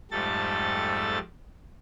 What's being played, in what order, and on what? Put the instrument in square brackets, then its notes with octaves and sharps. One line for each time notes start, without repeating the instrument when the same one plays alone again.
[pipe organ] F2 G#2 G3 A3 A4 A6